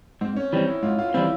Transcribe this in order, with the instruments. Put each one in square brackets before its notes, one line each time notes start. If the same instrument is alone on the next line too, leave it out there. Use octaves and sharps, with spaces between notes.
[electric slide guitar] G#2 [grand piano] C4
[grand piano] C#4
[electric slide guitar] E3 G3 C4 [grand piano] D#4
[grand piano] E4
[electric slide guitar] G#2 [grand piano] F4
[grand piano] F4
F4
[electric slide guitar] E3 G3 C4 [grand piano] E4